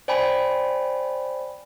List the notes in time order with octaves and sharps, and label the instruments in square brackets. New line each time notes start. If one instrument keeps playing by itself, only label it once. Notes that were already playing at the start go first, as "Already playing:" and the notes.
[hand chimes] C5 D5 G5 G#5 B5